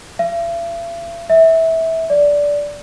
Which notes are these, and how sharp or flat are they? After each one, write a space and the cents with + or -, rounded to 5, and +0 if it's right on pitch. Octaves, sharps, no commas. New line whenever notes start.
E5 +45
E5 -20
D5 -10